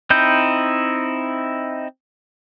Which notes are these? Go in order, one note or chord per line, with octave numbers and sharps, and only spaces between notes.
C4 D#4 E4 G6